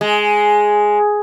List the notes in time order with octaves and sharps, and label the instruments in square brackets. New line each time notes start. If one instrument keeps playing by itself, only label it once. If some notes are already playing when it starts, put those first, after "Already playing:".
[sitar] G#3